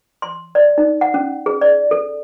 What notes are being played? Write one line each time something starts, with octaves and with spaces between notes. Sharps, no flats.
C6
D5
D#4
F#5
C#4
G#4
D5
A4